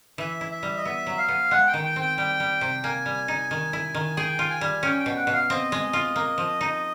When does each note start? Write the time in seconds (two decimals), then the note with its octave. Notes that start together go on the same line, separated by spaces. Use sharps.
0.18 E3 E5
0.41 E4
0.52 E5
0.63 G3
0.77 D#5
0.85 B3 E5
1.07 F#3
1.18 F5
1.29 B3
1.51 G#3 F#5
1.67 G5
1.74 D#3
1.85 G5
1.96 C4 G5
2.18 G3 G5
2.40 G3
2.61 C3
2.84 A#3 G#5
3.06 G3
3.28 D#4
3.51 D#3
3.73 E4
3.94 D#3
4.17 G#4 G5
4.39 F4
4.50 G#5
4.61 G3
4.83 C#4 G5
5.00 G5
5.06 B2
5.16 F#5
5.27 B2
5.33 F5
5.50 C4 D#5
5.72 G#3
5.93 F4
6.16 A#3
6.38 F3
6.61 D#4